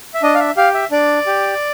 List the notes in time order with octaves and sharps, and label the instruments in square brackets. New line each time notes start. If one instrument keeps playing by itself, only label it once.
[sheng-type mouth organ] E5
D4 D#5
F5
E5
G4 F5
E5
D4 D5
G4